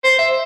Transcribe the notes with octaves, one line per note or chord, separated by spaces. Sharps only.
C5
E5